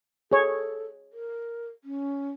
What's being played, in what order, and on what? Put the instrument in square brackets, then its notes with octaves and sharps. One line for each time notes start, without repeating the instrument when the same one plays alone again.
[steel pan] G#4 C#5 [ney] A4
[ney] A#4
C#4